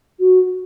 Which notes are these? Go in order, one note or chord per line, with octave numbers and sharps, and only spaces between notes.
F#4